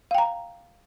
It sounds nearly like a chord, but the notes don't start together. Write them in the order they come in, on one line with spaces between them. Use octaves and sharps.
F5 G5 A#5